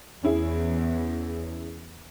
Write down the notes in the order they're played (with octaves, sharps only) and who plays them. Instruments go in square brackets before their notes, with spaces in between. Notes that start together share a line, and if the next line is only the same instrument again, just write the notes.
[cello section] E2 [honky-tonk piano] C#4 E4 G#4